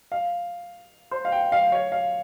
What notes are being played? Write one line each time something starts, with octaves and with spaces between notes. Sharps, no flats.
F5
C5
F5
G5
F5
C#5
F5